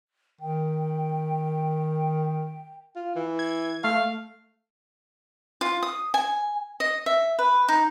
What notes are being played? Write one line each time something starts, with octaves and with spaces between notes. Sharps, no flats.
D#3 G5
F4
E3
G#6
A3 F5
F4
D#6
G#5
D#5
E5
B4
D#4